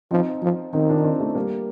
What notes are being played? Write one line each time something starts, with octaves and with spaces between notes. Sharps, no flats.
F3 C4 D#4
F3
D#3 C4 D#4
D4 F4
C4 D#4
A3 C4
G3 A#3